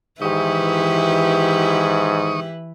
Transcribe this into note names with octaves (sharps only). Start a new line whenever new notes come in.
G#2 D#3 E3 E4 G4 B4 C#6 D#6